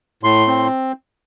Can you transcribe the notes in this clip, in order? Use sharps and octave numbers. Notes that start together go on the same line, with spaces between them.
A2 C6
C4